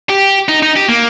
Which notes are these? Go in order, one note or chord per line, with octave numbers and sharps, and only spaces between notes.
G4
D#4
D#4
G4
A#3